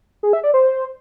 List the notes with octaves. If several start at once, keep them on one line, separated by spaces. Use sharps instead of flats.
G#4
E5
D5
C5